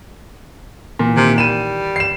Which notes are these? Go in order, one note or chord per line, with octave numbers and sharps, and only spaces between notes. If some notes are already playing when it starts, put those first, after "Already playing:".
A#2 E3
C3 D#3
G3 D#7 E7
C7 E7